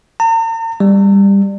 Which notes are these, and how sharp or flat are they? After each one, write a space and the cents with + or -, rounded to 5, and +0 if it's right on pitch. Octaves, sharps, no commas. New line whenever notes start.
A#5 -45
G3 +15